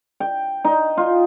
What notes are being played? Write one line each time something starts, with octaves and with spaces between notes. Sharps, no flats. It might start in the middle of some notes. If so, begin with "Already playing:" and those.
G5
D#4
F4